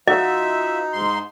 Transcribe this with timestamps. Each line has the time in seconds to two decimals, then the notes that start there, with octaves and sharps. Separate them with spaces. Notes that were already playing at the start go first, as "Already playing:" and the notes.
0.08 F3 D#4 F#4 D#5 E5
0.93 G#2 C6